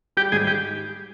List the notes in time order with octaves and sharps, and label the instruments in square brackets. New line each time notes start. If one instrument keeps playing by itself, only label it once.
[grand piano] G3 [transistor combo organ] G4
[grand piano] G#2 [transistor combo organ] G#4
[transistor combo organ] G4